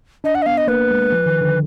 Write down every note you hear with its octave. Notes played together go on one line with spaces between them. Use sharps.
D4 D#5
F#5
D#5
B3 F5
D#5
A#3 B4
G#3
F3
D#3
D3